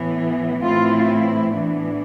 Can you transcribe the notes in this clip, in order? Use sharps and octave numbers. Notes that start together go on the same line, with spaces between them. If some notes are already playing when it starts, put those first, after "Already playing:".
Already playing: A2 E3 B3
A2 E3 A3 C4 E4 F4
A2 E3 B3 D4